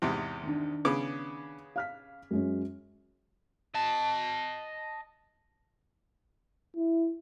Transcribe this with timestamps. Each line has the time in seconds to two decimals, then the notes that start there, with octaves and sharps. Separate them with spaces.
0.02 E2 G#2 C3
0.43 D#3 D4
0.85 C#3 B3 D6
1.76 F5 F6 B6
2.31 F#2 G#3 C#4
3.74 D#5 A5
6.76 E4